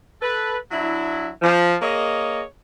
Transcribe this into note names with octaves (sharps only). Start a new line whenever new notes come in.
A4 B4
F#3 D4 E4
F3
A#3 G#4 C#5 D#5